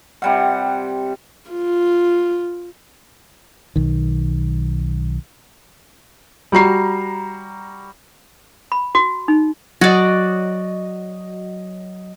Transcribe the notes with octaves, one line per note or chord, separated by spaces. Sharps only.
C3 G3 F#5
F4
B1 D#3
G3 F#4 A#5 C7
B5
F#4
D#4
F#3 F#4 D5 D#5